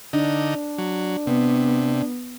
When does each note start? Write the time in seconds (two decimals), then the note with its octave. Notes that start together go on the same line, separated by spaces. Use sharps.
0.13 D3 D4 D#4
0.78 F#3
1.27 C3 B3